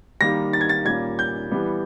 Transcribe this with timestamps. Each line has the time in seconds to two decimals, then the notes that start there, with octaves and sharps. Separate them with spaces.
0.20 D#3 G3 A#3 A#6
0.53 A6
0.61 G#6
0.69 A6
0.85 A#2 G3 A#3 C#4 G#6
1.19 G6
1.51 E3 G3 B3